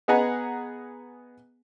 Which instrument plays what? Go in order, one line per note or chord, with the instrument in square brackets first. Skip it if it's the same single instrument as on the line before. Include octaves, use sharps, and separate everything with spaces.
[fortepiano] B3 G#4 D#5 F#5 G#5 A#5